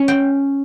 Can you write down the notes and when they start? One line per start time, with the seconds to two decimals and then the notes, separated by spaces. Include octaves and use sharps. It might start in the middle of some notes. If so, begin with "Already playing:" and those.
Already playing: C#4
0.08 G5